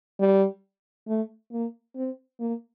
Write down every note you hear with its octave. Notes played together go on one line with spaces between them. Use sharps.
G3
A3
A#3
C4
A#3